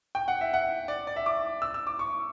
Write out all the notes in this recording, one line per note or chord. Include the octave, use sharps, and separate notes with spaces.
G5
F#5
E5
F#5
D5
D5
E5
D6
E6
E6
D6
C#6